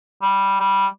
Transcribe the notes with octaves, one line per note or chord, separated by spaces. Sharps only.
G3
G3